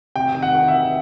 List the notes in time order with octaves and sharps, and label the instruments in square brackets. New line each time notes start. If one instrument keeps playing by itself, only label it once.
[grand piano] C3 G5
D#3
F#5
D#3
E5
D#3